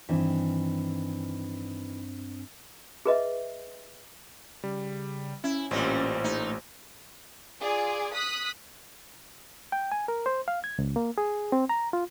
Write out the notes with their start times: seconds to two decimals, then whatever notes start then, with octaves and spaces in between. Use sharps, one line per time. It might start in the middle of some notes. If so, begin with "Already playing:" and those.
0.09 G2 D#3 E3 C4 D4
3.06 G#4 B4 D#5 E5
4.64 C#3 G3
5.44 C#4 E4
5.71 A1 A#2 G3 C4
6.24 A3 D#4
7.61 F4 G#4 D5
8.13 D#6 F#6 B6
9.72 G5
9.92 G#5
10.08 A#4
10.26 C5
10.48 F5
10.64 G#6
10.79 C#2
10.96 A#3
11.18 G#4
11.52 C4
11.69 A#5
11.93 F4